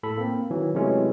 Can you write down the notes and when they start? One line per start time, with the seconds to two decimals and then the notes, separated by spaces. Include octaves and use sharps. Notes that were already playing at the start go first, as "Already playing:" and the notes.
0.03 A2 A4 B5
0.18 A#3 C4
0.51 D#3 E3 F#3
0.75 C3 E3 F#3 G#3 A3 C#4